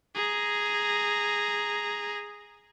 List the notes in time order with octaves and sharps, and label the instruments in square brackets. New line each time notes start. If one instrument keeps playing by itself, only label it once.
[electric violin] G#4 A#5